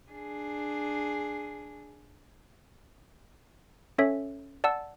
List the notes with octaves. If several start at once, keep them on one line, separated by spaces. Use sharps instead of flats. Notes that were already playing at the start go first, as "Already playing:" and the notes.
D4 G#4
C#4 A4 C#5 E5
D5 F#5 A5 E6